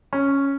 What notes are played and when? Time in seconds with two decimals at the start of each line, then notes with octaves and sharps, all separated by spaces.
0.13 C#4